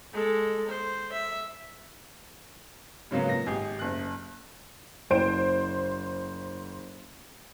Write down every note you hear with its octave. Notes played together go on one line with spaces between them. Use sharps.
G#3 A4
C5
E5
G#2 C#3 F#3 A#3 B3
A#2 A#6
G#1 G4 G#4
F#1 F#6
F#1 C5 D7